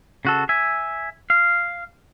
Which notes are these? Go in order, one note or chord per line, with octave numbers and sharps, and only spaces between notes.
C#3 F#4 A4
E5 G#5
F5